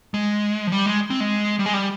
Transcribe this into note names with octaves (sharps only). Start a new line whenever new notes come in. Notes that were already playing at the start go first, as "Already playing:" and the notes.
G#3
F3
G3
G#3
C4
G#3
G3
G#3
G3